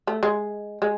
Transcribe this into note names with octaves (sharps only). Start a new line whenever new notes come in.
A3
G#3
G#3